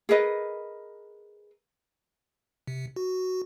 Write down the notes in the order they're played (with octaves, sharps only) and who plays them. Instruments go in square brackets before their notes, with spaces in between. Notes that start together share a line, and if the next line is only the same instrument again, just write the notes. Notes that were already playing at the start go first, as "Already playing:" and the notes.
[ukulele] G#4 A#4 B4 D#5
[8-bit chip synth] C3
F#4